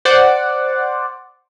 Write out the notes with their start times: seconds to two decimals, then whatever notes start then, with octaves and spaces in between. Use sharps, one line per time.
0.05 C5 D5 F#5